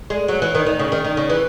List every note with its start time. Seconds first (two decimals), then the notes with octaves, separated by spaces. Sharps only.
0.10 G#3
0.28 F#3
0.42 E3
0.55 D#3
0.67 D#3
0.79 C#3
0.92 D#3
1.04 D#3
1.17 C#3
1.30 E3